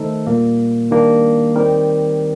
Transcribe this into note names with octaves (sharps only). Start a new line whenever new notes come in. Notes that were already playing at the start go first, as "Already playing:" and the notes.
Already playing: D#3 A3 D#4 A4 C5
A#2 G3 A#3
D#3 G3 A#3 D4
D#3 G3 C4 G4 A#4